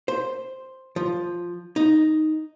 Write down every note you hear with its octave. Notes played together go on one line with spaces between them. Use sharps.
C5
F3
D#4